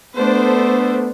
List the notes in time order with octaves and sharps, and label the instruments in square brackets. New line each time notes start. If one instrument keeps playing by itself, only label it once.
[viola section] A3 D4 C5 [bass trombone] B3